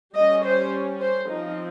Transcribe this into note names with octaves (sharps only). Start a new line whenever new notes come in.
G3 C#4 D#5
C5
C5
F3 C4 D#4